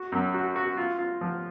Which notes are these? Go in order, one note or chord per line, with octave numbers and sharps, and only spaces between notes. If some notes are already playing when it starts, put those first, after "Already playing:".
Already playing: F#4
F#2
F#4
F#4
F4
F4
F3